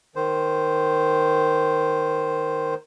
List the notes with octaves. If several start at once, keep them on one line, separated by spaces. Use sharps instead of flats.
D#3 C5